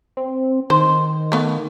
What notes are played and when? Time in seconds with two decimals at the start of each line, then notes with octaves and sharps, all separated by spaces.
0.17 C4
0.70 D#3 C5
1.32 A3 B3 F5